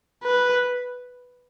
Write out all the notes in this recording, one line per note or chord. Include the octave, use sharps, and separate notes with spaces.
B4